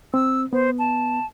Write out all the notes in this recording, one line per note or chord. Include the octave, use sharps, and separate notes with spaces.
C4 E6
B3 C5
A5